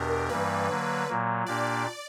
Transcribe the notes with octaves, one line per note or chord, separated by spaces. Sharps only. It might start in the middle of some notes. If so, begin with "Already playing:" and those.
Already playing: E2 B2 D4 G4 A#4
G2 E3 G3 A#3 B4
D3 F#3 A#3
A#2 F#3 A#3
A#2 A#3 D4 G4 D5